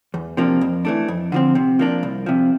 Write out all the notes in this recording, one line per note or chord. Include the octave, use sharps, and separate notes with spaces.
E2
C3 F3 A#3 D4
F2
E3 A3 D4
F2
D3 F3 C4
C3
F3 A#3 D4
C2
C3 F3